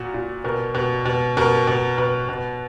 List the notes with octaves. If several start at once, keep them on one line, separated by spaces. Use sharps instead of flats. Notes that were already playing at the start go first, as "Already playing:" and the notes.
Already playing: A#2 F#4
A#2
B2 A#4
B2
B2
B2 A#4
B2
B2 B4
B2